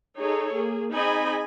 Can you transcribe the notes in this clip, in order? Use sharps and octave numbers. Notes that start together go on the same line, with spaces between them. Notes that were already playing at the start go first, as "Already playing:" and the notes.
D#4 G#4 A4 C#5
A#3 G#4
C4 D#4 G#4 D#5 G#5 B5